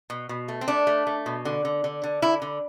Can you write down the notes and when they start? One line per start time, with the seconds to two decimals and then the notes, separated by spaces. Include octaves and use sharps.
0.10 B2
0.29 B2
0.48 A3
0.61 C4
0.68 A3 D4
0.87 A3
1.07 A3
1.26 B2
1.45 D3
1.65 D3
1.84 D3
2.04 D3
2.22 D3 E4
2.42 D3